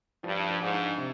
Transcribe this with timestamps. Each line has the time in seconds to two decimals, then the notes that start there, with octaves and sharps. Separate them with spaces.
0.24 G2 F3
0.49 F3
0.61 G#2
0.73 D4
0.98 C3